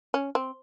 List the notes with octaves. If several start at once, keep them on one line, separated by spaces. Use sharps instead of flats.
C#4
C4